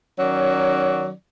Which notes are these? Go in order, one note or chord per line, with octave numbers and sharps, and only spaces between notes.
D#3 F#3 C#4 D5